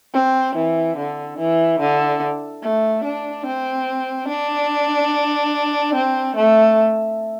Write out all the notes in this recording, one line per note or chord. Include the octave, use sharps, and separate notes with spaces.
C4
E3
D3
E3
D3
A3
D4
C4
D4
C4
A3